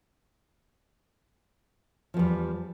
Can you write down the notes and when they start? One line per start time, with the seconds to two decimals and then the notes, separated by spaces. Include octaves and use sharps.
2.14 F3
2.17 E2
2.19 G3